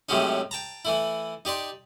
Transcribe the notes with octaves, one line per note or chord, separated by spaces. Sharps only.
A2 C3 F#3 G#3 C#4 D#4
G5 A5 A#5
E3 A3 E4
D#4 G4 D5 C6